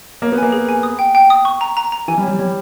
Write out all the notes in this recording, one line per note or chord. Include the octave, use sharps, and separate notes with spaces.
A#3 C#5
B3
A#3 G#5
G#4
G#5
D#6
G5
G5
D#6
C#6
A#5
A#5
A#5
E3 G#5
G3
C#5
G3
G3 C#5